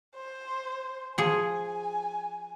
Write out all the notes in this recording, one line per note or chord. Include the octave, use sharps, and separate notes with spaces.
C5
F3 G#4 G#5